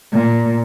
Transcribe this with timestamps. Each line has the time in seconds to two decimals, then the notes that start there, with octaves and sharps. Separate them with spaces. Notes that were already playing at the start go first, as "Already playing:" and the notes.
0.12 A#2